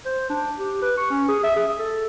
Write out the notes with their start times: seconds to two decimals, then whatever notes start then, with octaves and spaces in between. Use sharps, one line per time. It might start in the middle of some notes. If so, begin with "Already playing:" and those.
0.05 C5
0.30 D4
0.59 G4
0.82 B4
0.97 C#6
1.10 C#4
1.29 G#4
1.43 E5
1.56 G#4
1.79 A4